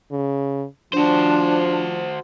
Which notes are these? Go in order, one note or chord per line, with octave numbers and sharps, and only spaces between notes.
C#3
F3 D4 F#4 C5